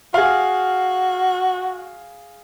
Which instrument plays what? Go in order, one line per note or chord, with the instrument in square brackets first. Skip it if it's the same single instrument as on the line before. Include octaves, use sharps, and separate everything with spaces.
[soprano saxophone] F#4 [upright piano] G#4 F5